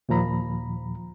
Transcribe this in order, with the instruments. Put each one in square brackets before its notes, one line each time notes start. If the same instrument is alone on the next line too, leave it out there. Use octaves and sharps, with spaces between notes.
[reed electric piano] D#2 A#2 F3 A#5 B5